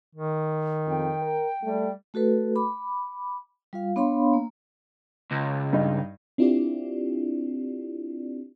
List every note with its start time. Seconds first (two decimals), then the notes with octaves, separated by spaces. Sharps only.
0.15 D#3
0.87 F2 G5
1.22 A#4
1.63 G3 A3
2.14 A3 F#4 A4 B4
2.56 B5 D6
3.73 G3 F4 F5
3.96 B3 D4 C#5 F5 B5 C6
4.33 A#3
5.32 C#2
5.73 G2 D#4
6.38 C4 D4 E4 F4 G4 D5